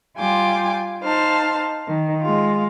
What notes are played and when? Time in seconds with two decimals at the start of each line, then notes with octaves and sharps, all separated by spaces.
0.17 G3 F4 G5 G#5 D6
1.02 D#4 C5 F5 A5
1.87 D#3
2.21 G#3 F4